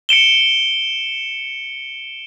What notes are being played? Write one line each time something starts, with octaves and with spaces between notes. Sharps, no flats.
C#7 D7 E7 G7